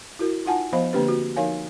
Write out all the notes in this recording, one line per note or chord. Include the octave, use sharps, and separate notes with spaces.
E4 F#4 A#4
D#4 F4 F#5 G#5 A5
F3 B3 C5 F5 B5
D3 A#3 C4 D4 G4 B4
F#4
F3 D#4 A#4 C#5 F5 G#5